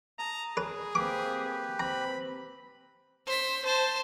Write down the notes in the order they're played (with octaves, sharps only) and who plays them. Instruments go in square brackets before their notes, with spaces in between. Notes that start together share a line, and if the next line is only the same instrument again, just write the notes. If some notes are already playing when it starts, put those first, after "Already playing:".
[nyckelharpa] A5 [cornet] A#5 [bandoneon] D#6
[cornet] G#4 [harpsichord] B4
[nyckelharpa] A#3 C4 [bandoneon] G4 B4 [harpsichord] D6
[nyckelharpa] C4 [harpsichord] A#5 [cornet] B5
[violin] C5 B6
C5 A5